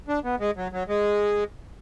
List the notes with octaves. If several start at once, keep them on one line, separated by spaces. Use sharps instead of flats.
D4
B3
G#3
F#3
F#3
G#3